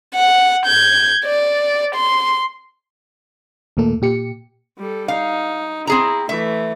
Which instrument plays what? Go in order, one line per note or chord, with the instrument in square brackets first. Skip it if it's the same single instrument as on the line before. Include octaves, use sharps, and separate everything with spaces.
[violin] F#5
G6 G#6
D5
C6
[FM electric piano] D#2 A#2 A3 A#3 A4
A#2 G4 C#7
[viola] G3 A4
[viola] D#4 [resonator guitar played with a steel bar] F5
[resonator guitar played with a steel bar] C4 G#4 A#5 [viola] E4
[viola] E3 A3 [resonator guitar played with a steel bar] E5